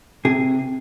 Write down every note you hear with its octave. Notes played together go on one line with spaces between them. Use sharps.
C3 G#4